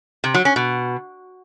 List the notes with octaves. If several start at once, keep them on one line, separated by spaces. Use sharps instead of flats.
C3
F#3
C#4
B2